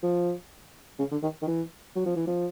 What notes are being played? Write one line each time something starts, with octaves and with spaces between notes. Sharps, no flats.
F3
C#3
D3
D#3
D#3
E3
F#3
F3
E3
F3